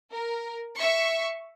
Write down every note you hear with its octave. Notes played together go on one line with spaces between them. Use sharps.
A#4
E5 C#6